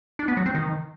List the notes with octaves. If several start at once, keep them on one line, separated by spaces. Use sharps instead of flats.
D4
B3
F#3
C4
D#3